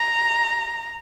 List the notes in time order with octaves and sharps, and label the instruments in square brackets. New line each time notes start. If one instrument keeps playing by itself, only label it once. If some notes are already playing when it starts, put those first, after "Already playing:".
Already playing: [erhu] A#5